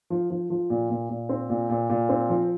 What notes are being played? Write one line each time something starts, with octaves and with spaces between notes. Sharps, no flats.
F3
F3
F3
A#2
A#2
A#2
C4
A#2
A#2
A#2
C4
F3